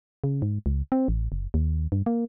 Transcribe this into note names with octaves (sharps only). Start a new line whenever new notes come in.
C#3
G#2
C#2
C4
A1
F#1
D#2
G2
A#3